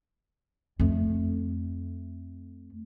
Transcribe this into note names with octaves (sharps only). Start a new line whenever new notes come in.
F2 A3